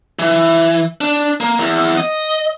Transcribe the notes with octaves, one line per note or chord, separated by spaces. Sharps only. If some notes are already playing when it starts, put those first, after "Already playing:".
E3
D4
A#3
E2
D#5